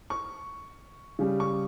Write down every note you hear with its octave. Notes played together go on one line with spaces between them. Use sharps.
C#6
C#3 G3
C#6